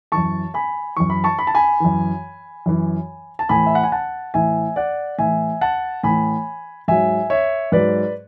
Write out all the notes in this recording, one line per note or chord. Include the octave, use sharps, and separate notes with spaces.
F#2 E3 A5 C#6
G#5 B5
F#2 E3 C#6
B5
A5 C#6
B5
A5
G#5 B5
F#2 E3
F#2 E3
A5
A2 E3 G#5 B5
E5
F#5
G#5
F#5 A5
A2 E3 E5 G#5
D5 F#5
A2 E3 E5 G#5
F#5 A5
A2 E3 G#5 B5
G#2 F#3 E5 G#5
C#5 E5
G#2 F#3 B4 D5